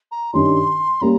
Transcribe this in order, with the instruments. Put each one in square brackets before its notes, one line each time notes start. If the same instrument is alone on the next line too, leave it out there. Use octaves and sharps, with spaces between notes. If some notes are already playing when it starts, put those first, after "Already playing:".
[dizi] A#5
[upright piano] G2 D#3 G3 C#4 [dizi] C6
[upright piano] G3 A#3 C#4 [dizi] A#5